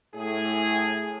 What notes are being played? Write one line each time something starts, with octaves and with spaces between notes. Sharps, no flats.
A2 G#4